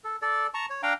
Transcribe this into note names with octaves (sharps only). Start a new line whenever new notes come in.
A4
A4 D5
A5 A#5 C#6
C#5
D4 F5 G5 A#5